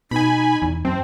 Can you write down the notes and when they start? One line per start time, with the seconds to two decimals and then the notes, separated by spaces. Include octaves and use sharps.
0.11 B2 D#4 G#5 B5
0.62 E2
0.85 F#2 C4 A5